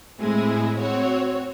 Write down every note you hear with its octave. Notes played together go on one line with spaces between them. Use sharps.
A2 G#3 C4 E4 G#4
C4 F#4 C#5